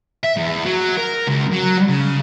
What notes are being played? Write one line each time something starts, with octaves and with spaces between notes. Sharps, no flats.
E5
E2
F#3
A#4
C#2
F#3
C#3